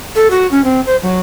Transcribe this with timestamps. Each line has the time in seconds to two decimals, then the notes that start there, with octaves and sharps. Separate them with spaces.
0.15 A4
0.30 F#4
0.51 C#4
0.64 C4
0.86 C5
1.02 F#3